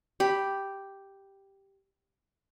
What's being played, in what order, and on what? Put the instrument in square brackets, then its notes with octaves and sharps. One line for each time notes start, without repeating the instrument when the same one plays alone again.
[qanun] G4 B5